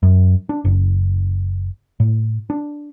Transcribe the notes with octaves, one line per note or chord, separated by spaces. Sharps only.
F#2
D4
F#1
A2
D4